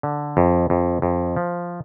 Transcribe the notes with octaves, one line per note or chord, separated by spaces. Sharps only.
D3
F2
F2
F2
F3